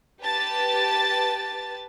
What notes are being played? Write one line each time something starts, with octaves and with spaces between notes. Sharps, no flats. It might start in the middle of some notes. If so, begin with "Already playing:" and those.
G4 B4 A5 A6